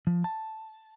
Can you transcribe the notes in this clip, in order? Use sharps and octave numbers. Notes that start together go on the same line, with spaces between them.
F3
A5